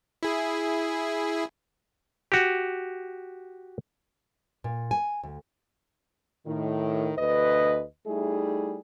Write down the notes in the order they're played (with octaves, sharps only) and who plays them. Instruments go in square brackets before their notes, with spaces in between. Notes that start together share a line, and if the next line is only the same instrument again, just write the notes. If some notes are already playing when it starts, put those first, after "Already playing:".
[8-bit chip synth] E4 G#4
[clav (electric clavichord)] F#4 G4
[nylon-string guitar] A#2
G#5
D2
[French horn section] A2 D#3
D2 B4 D#5
G3 A3 D#4 E4 G#4